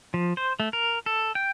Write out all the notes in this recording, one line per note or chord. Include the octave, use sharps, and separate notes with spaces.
F3
C5
A3
A#4
A4
G5